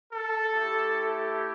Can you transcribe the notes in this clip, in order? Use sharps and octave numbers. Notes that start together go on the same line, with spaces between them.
A4
A3 E4 G4